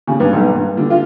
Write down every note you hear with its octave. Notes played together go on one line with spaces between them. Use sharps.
C#3
G2
B1
G2
D3
F4